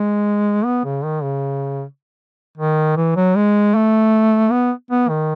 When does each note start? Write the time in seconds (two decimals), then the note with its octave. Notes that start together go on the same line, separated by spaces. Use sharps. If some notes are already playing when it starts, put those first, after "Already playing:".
Already playing: G#3
0.65 B3
0.84 C#3
1.04 D#3
1.23 C#3
2.57 D#3
2.96 E3
3.16 F#3
3.35 G#3
3.75 A3
4.51 B3
4.91 B3
5.09 D#3